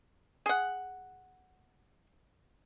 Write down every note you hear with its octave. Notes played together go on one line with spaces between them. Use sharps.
G#4 F#5